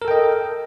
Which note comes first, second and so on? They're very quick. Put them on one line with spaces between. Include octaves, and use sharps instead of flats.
A#4 A4 G5 D#5